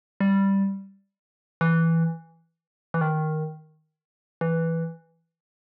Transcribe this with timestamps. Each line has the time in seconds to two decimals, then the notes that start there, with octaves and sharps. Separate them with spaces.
0.21 G3
1.61 E3
2.94 E3
3.01 D#3
4.41 E3